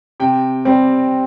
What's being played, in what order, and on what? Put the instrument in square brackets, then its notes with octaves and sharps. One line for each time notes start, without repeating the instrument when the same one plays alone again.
[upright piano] C3 G5
G3 C4